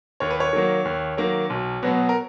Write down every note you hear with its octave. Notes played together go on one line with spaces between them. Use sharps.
D#2 C#5
B4
C#5
D#3 F#3 A#3
D#2
D#3 F#3 A#3
B1
B2 F#3 B3
A#4